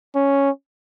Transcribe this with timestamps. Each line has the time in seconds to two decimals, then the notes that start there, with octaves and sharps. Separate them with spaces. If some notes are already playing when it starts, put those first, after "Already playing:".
0.15 C#4